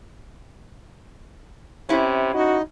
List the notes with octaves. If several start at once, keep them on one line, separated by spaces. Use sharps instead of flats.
C3 C#4 E4
D#4 F#4 D#5